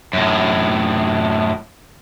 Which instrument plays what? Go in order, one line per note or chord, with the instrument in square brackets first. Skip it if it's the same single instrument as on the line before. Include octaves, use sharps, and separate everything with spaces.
[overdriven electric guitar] F#2 A2